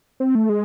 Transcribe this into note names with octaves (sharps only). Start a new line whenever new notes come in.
C4
A3
G#3